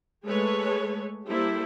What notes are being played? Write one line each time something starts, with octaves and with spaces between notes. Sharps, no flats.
G#3 A3 G#4 A4 B4 C#5
G3 A#3 E4 G4 A4 C5